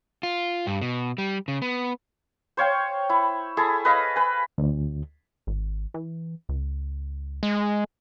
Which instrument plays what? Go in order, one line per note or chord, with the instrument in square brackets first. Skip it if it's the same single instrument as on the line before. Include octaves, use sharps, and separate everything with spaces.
[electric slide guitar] F4
G2
B2
G3
C#3
B3
[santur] C5 C#5 F5 G5
E4
E4 G#4 A4
B4 D#5 F5
B4 G#5
[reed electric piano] D2
[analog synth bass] G#1
E3
C#2
[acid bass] G#3